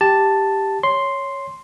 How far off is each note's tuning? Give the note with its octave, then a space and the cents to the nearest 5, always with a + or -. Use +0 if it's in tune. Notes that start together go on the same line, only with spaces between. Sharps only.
G4 +0 A5 +0
C#5 +0 C6 +0